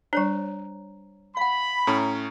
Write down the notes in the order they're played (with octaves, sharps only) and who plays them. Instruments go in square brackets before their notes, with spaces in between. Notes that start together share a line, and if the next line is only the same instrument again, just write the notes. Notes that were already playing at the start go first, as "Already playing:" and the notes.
[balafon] G3 D4 [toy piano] C5 C#5 A#5
[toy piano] F5 F#5 [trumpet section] B5
[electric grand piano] A2 C#4 [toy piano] E4 A#5